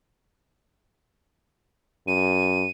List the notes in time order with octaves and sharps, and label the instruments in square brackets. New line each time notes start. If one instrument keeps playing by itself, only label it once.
[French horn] F#2 [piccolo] D#7